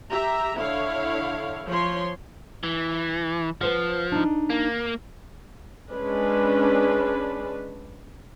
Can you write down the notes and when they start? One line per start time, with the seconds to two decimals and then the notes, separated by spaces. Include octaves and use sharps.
0.11 G4 E5 A#5
0.58 D3 E4 C#5 F5
1.67 F3 C#5 C6
2.63 E3
3.61 F3 B4 C5 F#5
4.12 D4 D#4
4.50 A#3
5.91 G#3 C#4 D4 B4